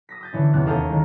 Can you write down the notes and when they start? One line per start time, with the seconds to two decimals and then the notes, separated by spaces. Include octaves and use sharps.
0.09 D#6 A#6 B6
0.21 D#6 G6 A6
0.33 D3 E3 C#4
0.53 E2 C3 C#4 F#6
0.66 D#2 C#4 A4 F5 D#6 G6
0.89 D#3 G#3